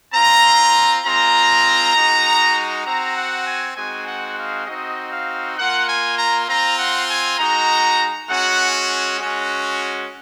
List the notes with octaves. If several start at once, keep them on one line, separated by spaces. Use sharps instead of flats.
C4 F4 A#5
G#3 C4 F4 A#5
G#3 D#4 F#4
C4 F#4 A#5
F#5
G#5
G#3 C4 D#4 F#4 G#5
F#5
F5
C4 D#4 F#4 D#5
F5
A#3 F4 F#5
G#5
A#5
C4 F4 A#5
F#5
G#5
G#3 D#4 F#4 A#5
G#3 C#4 F#4 F#5
G#3 C#4 F#4